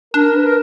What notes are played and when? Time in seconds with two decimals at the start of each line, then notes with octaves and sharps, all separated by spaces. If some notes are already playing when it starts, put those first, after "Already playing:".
0.14 D4 A#4
0.35 B4
0.46 A#4